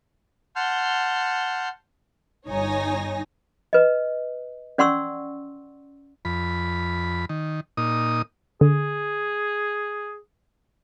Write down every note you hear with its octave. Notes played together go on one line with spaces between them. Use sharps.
F#5 A5 C6 F6 G6
G1 D#4 C#5 G#5 A#6
B4 D#5
C#4 D5 F#5 C6 C#6 E6
F2 B5
D#3
A#2 D#4 D#6
D3 G#4